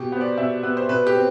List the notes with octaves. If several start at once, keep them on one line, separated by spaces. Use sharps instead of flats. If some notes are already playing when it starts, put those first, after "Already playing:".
Already playing: B2 G4
B3 C5
D5
B2 E5
B3 B4
C5
B2 B4
G4
C4